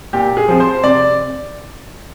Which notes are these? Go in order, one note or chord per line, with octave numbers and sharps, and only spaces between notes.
A#2 G4
G#4
F3 C4
C5
C3 D5